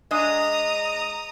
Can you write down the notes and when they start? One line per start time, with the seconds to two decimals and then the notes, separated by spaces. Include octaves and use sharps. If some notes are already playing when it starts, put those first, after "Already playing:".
0.11 G#3 D4 D#5 A#5 D#6